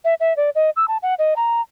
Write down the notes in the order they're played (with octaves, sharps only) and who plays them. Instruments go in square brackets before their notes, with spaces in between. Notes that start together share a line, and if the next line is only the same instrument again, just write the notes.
[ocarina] E5
E5
D5
D#5
E6
A5
F#5
D#5
A#5